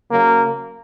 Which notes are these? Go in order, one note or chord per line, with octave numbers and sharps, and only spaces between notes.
C#3 F#3 A#3